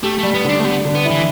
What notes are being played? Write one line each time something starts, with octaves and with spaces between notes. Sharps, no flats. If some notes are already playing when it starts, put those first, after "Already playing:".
A3 G4
G3 A3
B3
D3 D4
A3
B3 G4
D3
B3
E4
E3